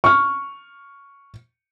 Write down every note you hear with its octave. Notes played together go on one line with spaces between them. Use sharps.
C#6 F6